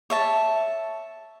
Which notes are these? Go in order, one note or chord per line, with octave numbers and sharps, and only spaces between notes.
C#5 E5 A5